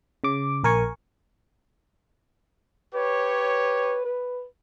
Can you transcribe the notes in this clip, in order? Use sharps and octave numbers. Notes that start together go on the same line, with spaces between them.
C#3 D6
A#1 A#4 G#5 C#6
G4 B4 C#5
B4